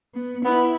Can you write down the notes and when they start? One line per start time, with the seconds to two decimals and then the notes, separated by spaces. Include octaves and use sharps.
0.14 B3
0.45 B3 E4